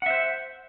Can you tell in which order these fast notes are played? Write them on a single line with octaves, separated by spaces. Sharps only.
F#5 E5 C5